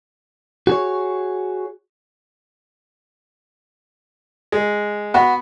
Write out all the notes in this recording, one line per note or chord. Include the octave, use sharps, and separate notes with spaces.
F#4 G#4 C#5
G#3
B3 F#4